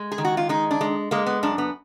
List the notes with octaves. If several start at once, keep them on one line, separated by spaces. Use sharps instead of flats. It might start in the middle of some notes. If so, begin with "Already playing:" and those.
Already playing: G#3
G#4
D#3
F#4
F4
G#3 D#4
D4
G#3
G#3 A#3
B3
F#2 D4
B3